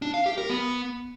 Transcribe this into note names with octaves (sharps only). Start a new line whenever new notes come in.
D4
F5
G4
A#4
B3